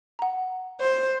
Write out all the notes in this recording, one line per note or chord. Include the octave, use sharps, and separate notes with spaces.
F#5 A#5
C5